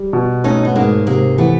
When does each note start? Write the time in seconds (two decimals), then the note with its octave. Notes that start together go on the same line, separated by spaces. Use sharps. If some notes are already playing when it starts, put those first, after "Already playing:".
Already playing: G3
0.13 B2
0.44 A3 C#4 D#4
0.65 B3
0.75 G#2 G#3 A#3
1.07 C3 G#3 A#3
1.38 E3 A3 B3